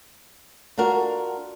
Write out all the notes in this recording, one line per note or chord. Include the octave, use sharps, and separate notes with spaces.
D4 F4 F#4 A#4